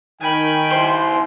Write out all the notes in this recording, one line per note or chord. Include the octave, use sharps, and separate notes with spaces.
D#3 G5 G#5 B5
E4 C5 C6